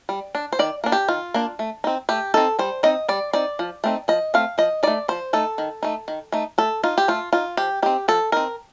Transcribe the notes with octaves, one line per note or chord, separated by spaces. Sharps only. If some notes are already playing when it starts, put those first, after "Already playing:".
G3
D4
C5
D#3 D5
A#3 D4
G4
D#3 F4
A#3 D4
A3
C4 D#4
A3 G4
C4 D#4 A4
G3 C5
C4 D#4 D#5
G3 D5
C4 D#4 D5
F3
A3 C4 D#4
F3 D#5
A3 C4 F5
F3 D#5
A3 D#4 D5
F3 C5
A3 D#4 A4
D#3
A3 D#4
D#3
A3 D#4
A3 A4
D#4 F4
G4
A3 F4
D#4 F4
F3 G4
C4 D#4 G4
F3 A4
C4 D#4 A#4